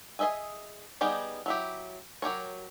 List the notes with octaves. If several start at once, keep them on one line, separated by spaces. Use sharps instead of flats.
G#4 B4 D#5 E5 G#5
G3 B3 D#4 G4 G#4
F#3 E4 G4
F#3 G4 A#4 C#5